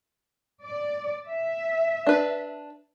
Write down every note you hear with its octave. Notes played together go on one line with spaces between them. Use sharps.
D5
E5
D4 B4